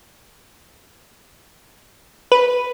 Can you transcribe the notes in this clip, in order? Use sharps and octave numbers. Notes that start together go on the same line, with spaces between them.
B4